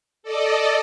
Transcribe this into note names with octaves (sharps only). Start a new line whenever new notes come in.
A4 D5 D#5